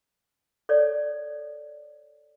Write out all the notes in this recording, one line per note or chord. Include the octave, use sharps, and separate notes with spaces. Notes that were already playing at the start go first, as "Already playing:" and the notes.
A4 C#5 D5